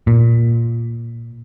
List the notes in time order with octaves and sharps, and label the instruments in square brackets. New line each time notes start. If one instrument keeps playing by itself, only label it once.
[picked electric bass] A#2